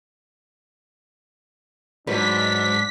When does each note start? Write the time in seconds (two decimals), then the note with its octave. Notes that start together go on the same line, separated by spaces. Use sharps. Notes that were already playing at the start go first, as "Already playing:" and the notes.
2.07 G#2 F#3 D4 D#4 B4 B6